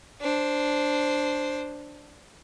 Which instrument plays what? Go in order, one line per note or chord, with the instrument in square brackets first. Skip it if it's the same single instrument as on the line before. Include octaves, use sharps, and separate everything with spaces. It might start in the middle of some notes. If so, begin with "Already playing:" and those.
[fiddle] D4 C5